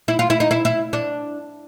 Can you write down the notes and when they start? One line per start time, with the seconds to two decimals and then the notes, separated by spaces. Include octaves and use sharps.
0.08 E4
0.19 F4
0.30 E4
0.40 D#4
0.51 E4
0.65 E4
0.93 D4